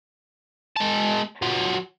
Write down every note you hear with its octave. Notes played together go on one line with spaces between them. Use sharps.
G#3 A5
F#3 F4